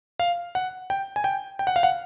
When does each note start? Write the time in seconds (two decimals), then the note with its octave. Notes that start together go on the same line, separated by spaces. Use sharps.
0.20 F5
0.55 F#5
0.90 G5
1.16 G#5
1.24 G5
1.59 G5
1.67 F#5
1.76 F5
1.83 F#5